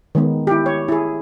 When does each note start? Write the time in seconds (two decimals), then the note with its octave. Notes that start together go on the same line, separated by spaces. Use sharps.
0.15 D#3 G#3 B3
0.47 E4 G4
0.66 C#5
0.88 E4 G#4